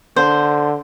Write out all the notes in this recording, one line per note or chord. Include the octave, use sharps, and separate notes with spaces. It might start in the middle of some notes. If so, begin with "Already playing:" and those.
D3 C5